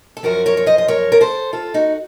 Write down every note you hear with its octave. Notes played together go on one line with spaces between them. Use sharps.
A4
F#2 F3 F#4 A#4
A#4 C#5
C#5
C5 D#5
D#5
A#4 C#5
A#4
A4 C5
F4 A4
D#4 F#4